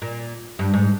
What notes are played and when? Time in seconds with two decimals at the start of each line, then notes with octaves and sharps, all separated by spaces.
0.02 A#2
0.59 G2
0.74 G#2